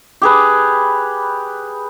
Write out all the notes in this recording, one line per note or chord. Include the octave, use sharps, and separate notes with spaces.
G4 G#4 B4